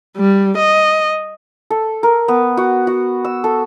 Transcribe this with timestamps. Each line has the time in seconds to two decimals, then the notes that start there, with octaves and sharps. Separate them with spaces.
0.17 G3
0.58 D#5
1.70 A4
2.03 A#4
2.28 B3
2.57 F#4
2.87 F#4
3.25 E6
3.44 A4